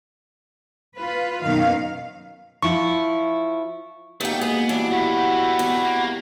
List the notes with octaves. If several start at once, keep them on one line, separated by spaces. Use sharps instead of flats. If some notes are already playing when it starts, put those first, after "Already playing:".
F4 B4
F#2 B2 D#3 F5
F3 E4 F4 C#6
D#2 G#2 B2 A3 A#3 G5
B3 G#4
E3 F#3 G3 D4
A3 E4 F#4 B5
E2 C3
A#3